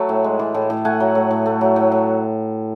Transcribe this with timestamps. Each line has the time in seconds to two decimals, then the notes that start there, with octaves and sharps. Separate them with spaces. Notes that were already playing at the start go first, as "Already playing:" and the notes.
Already playing: F#3 A3 A5 B5
0.09 A2
0.24 G#3
0.39 E3
0.54 A2
0.70 A2
0.85 A3 F#5 G#5
1.00 F#3
1.15 A2
1.31 A2
1.46 A3
1.61 F#3
1.76 A2
1.92 A2